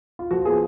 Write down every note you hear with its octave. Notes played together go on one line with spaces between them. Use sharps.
F4
F3 F#4
B3 F4 G#4